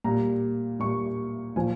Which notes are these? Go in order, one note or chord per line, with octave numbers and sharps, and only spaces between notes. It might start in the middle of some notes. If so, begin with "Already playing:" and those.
A#2 G3 A#5
A#2 G3 C#6
A#2 F3 G#5